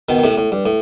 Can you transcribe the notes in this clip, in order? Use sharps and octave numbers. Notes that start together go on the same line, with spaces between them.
B2 D#3
D#3
A2 C3
A2
G2
A2